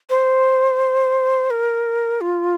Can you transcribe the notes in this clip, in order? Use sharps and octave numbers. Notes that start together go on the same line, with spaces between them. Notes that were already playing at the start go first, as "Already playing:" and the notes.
C5
A#4
F4